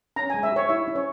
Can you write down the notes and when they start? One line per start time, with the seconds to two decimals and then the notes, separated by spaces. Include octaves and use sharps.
0.16 C#4 A#5
0.30 G#3 G#5
0.43 E5
0.52 G4 C#5
0.69 E4 E5
0.87 C#4
0.95 C#5